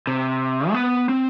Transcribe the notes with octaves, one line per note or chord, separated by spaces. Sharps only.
C3
A3
B3
C4